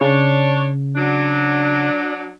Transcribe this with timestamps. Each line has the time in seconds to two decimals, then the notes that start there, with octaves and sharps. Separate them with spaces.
0.01 C#3 D4 C#5
0.96 F#3 D4